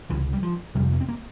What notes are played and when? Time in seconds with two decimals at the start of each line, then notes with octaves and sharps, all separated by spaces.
0.10 C#2 C3 E3
0.33 G3
0.43 F3
0.75 F2 C3 G3
0.92 A#3
1.01 C4
1.08 A#3